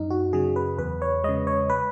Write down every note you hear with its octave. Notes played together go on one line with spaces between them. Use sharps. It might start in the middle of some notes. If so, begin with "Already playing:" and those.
Already playing: F#2 D#4
F#4
C#3 F#3 G#4
B4
E2 B4
C#5
C#3 G#3 D#5
C#5
B4